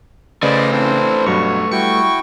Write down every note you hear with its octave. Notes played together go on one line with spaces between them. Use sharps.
C#3 A3 B4 C5 D5 D#5
C4 D4 E4 C5
G2 B2 F#3 C#5
G3 E4 F#4 G5 C#6